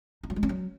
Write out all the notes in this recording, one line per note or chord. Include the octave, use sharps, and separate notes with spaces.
D#4
F#3
G#3
C#4
F#3